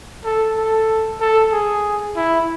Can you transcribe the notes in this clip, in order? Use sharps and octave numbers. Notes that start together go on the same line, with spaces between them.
A4
A4
A4
G#4
E4